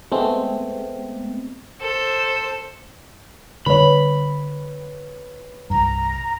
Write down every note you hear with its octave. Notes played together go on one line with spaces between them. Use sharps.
G#3 A3 B3 C4
A4 C5
D3 G3 C4 B4 C#5 B5
C2 G2 A#5